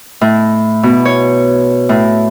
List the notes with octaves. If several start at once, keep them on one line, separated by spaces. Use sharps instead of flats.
A2
B2
C#5
A2